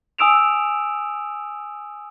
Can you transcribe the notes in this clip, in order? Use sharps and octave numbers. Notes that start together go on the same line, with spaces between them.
G#5 D#6 E6 D7 E7 F7